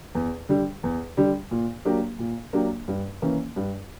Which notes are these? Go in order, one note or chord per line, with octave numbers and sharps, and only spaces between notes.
E2
D3 G3
E2
D3 G3
A#2
F#3 A#3 D4 G4
A#2
F#3 A#3 D4 G4
G2
E3 A#3 C#4
G2